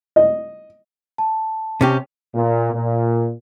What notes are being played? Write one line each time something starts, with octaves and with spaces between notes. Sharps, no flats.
D#5
A5
C3 C#4 G4
A#2
A#2